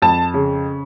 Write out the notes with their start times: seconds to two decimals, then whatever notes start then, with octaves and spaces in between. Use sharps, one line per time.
0.02 F2 A5
0.34 C#3